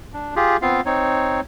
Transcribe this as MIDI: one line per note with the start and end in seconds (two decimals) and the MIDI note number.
0.13 0.34 62
0.36 0.57 65
0.36 0.57 67
0.36 0.57 68
0.62 0.81 59
0.62 0.81 60
0.62 0.81 65
0.62 0.81 77
0.86 1.40 60
0.86 1.40 63
0.86 1.40 73